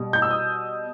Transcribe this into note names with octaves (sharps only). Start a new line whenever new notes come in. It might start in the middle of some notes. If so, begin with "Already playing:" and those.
Already playing: B2 G3
G6
E6
D#6